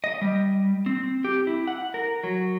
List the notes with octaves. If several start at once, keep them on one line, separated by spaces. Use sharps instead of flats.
D#5
G3
C4
G4
E4
F#5
A#4
F#3